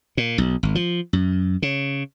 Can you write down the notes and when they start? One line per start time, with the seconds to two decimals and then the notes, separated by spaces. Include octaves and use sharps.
0.17 A#2
0.38 B1
0.63 G#1
0.75 F3
1.13 F#2
1.62 C#3